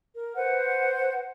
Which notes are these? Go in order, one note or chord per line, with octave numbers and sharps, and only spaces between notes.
A#4
B4 C5 F#5